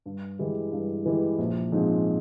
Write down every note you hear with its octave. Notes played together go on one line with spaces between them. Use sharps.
G2
E3 G#3 E4 G4
G2
E3 G#3 E4 G4
A#1
G#2 F3 G#3 C4